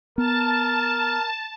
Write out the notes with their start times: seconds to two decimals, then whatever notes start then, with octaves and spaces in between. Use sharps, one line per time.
0.18 B3 A#4 A5